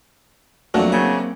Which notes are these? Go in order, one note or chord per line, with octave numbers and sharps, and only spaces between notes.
F2 F#3 A3 A#3 D4 F#4
C#3 A#3 C4 E5